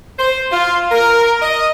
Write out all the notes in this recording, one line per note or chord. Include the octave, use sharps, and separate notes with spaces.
C5
F4
A#4
D#5